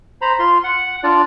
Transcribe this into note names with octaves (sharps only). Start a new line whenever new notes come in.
C5 A#5 B5
F4 C6
F#5
D4 F4 D5